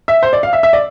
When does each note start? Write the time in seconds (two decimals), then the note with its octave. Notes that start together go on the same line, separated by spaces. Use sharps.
0.08 E5
0.23 C5
0.33 D5
0.43 F5
0.53 E5
0.63 E5
0.73 D5